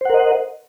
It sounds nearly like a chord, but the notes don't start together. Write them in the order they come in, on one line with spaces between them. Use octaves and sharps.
C5 F#5 A#4 D#5